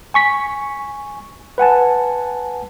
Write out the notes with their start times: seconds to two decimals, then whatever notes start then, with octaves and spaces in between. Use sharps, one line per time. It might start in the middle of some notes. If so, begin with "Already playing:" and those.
0.14 G#5 C#6 B6
1.58 B4 F#5 G#5 A5